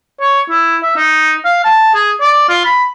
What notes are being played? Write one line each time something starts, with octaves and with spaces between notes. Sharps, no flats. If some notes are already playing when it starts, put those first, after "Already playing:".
C#5
E4
E5
D#4
F5
A5
G#4
D5
F4
B5